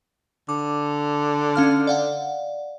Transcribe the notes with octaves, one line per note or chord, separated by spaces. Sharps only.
D3 D6
C#4 F5 F6
D5 F5 F#5